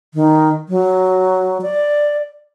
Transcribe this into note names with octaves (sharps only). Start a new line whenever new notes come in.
D#3
F#3
D5